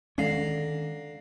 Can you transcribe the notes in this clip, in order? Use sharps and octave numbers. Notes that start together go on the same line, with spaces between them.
D3 D#3 G#3 C#4 F5 A#5